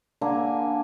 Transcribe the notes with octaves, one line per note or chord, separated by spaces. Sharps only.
D3 A#3 G#5